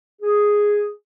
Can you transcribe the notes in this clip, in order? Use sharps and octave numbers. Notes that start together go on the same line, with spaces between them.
G#4